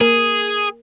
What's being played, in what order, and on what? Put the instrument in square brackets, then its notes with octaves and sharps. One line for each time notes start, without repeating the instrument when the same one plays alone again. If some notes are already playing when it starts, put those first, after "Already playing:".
[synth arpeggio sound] A#3 A#4 [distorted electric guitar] G#4